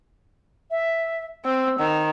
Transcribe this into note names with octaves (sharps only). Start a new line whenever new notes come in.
E5
C4 E6
D#3